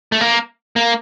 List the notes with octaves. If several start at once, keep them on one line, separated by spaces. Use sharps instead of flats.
A3
A#3
A#3